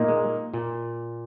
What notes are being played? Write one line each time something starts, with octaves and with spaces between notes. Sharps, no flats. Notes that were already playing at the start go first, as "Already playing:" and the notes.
Already playing: A#2 A#3 D#4
G#3
A#2